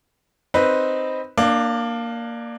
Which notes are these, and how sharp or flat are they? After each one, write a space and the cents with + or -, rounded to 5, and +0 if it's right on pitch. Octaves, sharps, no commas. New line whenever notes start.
C4 +0 D#4 +0 B4 +0
A#3 +0 D4 +20 D5 -40